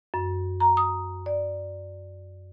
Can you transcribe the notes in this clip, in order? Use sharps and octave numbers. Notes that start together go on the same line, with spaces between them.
F#2
A#5
D#6
D5